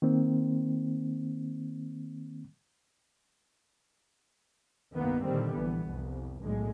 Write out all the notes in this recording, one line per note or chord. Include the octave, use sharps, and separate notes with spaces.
D#3 A#3 C4
C2 G2 D#3 A#3 B3
A#2 D3 D#3 G3 C4
A#1 E3 B3
C2 F2
B1 A2 D3 G#3